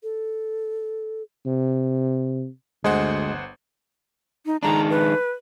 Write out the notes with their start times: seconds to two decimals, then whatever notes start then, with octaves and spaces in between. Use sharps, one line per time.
0.03 A4
1.46 C3
2.84 G1 D2 G#3 C5 F#5
4.46 D#4
4.63 D#3 G#3 D4 A#5
4.90 B4